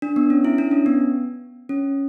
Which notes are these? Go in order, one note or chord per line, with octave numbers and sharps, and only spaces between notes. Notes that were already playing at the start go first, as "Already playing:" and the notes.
D4
B3
C#4
E4
D4
C#4
B3
C#4